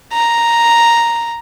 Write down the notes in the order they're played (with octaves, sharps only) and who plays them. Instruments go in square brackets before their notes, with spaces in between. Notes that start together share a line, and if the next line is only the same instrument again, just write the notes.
[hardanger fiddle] A#5